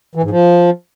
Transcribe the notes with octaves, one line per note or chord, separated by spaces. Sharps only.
E3
G#2
F3